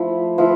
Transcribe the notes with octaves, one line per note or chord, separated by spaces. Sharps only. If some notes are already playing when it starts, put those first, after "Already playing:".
Already playing: F3 A3 E4
F3 A3 E4